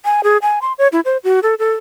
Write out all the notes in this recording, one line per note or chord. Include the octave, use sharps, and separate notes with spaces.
G#5
G#4
G#5
C6
C#5
E4
C5
F#4
A4
A4